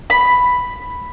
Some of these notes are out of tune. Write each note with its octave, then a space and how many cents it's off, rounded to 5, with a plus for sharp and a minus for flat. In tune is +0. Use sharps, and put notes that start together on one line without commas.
B5 +0